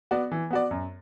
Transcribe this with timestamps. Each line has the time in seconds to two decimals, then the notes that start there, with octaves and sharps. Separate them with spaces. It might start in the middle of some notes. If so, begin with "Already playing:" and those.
0.11 B3 F#4 D5
0.32 E3
0.51 B3 F#4 D5
0.71 F#2